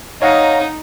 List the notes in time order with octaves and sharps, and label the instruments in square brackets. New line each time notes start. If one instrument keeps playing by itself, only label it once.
[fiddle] D#4 [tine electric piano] C#5 F5 F#5 [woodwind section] D#5 A#5